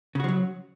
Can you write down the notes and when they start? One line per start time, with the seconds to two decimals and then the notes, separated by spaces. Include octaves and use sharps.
0.15 C#3
0.20 F#4
0.24 F3
0.28 F#3